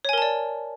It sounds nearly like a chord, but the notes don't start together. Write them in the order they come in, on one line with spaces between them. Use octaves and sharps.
C#5 G#5 A#4 A5 D5